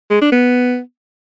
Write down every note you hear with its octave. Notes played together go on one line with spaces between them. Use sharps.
G#3
D4
B3